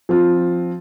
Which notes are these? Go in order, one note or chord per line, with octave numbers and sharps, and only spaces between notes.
F3 C4 F4